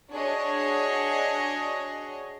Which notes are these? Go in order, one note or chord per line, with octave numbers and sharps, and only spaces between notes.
D4 F#4 G#4 C#5 D#5